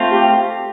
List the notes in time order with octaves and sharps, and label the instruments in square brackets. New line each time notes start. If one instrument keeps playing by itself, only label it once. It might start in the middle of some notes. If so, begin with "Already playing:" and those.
Already playing: [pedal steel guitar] A3 C4 F4 C5
[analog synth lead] G4